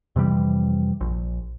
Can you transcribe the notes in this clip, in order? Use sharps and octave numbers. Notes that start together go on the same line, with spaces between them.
F2 C3 E3 G3
A#1